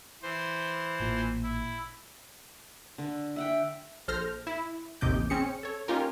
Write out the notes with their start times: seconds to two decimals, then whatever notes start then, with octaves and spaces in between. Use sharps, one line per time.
0.23 E3 C5
1.00 A1 A#2
1.43 E4
2.98 D3
3.36 E5 F#5 G5
4.08 A#1 A4 C5 F6 G6 A#6
4.47 E4
5.01 A1 D#2 C3 D#5 D6 G6
5.30 C4 C#4 G#4 C#7
5.63 A4 C#5
5.88 A#3 C#4 D#4 F4 G4 A#4